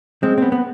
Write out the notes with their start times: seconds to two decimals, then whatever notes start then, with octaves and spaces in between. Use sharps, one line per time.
0.23 G#3 C4
0.38 B3 C4
0.52 B3